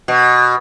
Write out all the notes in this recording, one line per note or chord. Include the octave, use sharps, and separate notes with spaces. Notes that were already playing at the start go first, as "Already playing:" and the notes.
B2